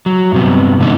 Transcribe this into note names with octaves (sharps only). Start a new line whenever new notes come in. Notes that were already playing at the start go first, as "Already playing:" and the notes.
F#3
G2 C3 B3
G#2 D3 E3 G#3 B3 D#4